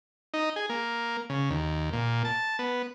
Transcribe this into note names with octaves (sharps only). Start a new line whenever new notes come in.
D#4
G#4
A#3
C#3
D#2
A#2
A5
B3